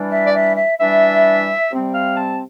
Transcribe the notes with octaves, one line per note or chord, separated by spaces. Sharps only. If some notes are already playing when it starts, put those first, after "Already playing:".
Already playing: E3 G3 D4
E5
D5
E5
E5
E3 G3 D4 E5
C3 G3 C4
F5
A5